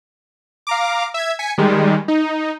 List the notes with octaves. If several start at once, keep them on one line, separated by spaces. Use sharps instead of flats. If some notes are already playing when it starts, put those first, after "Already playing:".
F5 A#5 D6
E5 G#6
G#5 B6 C#7
D#3 G3 G#3
D#4